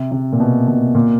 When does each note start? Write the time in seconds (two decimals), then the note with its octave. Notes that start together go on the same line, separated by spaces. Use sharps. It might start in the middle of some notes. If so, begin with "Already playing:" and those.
Already playing: C3
0.12 C3
0.33 A#2
0.40 B2
0.68 B2
0.95 A#2